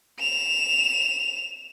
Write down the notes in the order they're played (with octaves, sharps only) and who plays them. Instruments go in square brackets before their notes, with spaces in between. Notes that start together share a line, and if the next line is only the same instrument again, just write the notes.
[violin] E7 F7